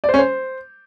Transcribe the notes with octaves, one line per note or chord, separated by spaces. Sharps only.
D5
C5
C#4
C5